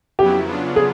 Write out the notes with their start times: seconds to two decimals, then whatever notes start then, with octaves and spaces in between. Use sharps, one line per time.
0.18 F2 C#3 F#3 B3 E4 G4
0.47 C#3 F#3 B3 D4 F4
0.76 G#4